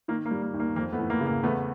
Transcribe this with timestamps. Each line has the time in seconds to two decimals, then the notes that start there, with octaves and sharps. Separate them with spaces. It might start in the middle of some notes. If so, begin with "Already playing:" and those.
0.08 D#3 A#3
0.25 A#3
0.31 G3
0.42 A#3
0.54 D#2
0.60 A#3
0.76 F2 A#3
0.93 A3 B3
0.99 E3
1.10 A#3
1.21 C#3
1.27 A#3
1.43 E2 A3 B3